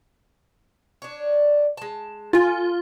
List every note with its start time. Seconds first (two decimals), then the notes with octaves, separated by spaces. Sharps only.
1.02 D4 C#5
1.77 G#3 A5
2.33 F4 A4 G#5